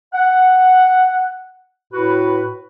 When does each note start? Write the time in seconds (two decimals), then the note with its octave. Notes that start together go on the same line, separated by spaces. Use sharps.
0.13 F#5
1.93 A2 F#4 B4